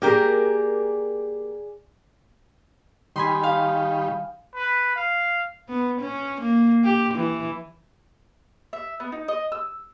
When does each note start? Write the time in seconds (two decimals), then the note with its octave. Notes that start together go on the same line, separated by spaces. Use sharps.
0.02 A#3 G4 G#4 A#4 D5
3.16 D#3 G3 G#5 B5 C6
3.43 F5
4.55 B4
4.96 F5
5.69 B3
6.01 C#4
6.41 A#3
6.84 G4
7.14 E3
8.73 E5
9.00 B3
9.12 D#4
9.28 D#5
9.52 E6